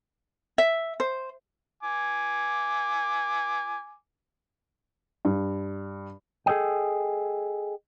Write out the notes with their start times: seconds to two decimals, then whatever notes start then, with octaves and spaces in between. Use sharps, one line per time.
0.58 E5
1.00 C5
1.83 G#5 D6
5.25 G2
6.46 G#4 A4 D5 D#5 G5